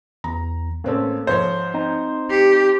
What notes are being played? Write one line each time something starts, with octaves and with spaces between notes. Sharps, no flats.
E2 A#5
A1 A#3 C4 C#4 A4
G#2 F3 C5 C#5
C4 D#4
G4 C7 C#7